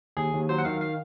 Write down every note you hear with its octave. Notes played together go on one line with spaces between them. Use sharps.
D#2 G#4
D#2
F#3 C5
F#5
D#3 F5
F5